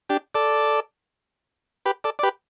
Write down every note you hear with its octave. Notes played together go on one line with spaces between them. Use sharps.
D4 G4
A4 D5
G4 B4
A4 D5
D5
G4 B4